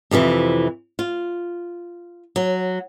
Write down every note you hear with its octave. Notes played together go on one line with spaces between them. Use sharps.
F2 C3 D#3 E3
F4
F#3